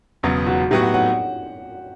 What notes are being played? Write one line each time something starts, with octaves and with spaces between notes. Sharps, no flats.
E1 E2 C#3 F#3 B3
F#4
A2 F#3 B3 F#4 G4
F#5
F#5